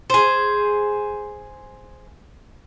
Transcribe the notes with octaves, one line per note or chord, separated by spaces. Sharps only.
G#4 C5